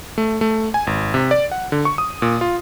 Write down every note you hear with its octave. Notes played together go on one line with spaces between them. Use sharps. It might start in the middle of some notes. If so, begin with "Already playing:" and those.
A3
A3
G#5
G#1
C3
D5
F#5
D3
C#6
D#6
A#2
F4